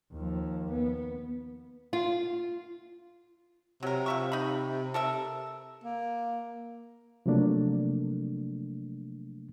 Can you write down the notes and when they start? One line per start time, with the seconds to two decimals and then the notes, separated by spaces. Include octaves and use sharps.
0.13 D#2 F3
0.71 B3
1.93 F4
3.83 C3 F#3 A#4
4.06 F3 E5 C#6
4.32 D#4 B5
4.94 A4 A#4 E5
5.84 A#3
7.26 C3 F3 F#3 A3 A#3 D4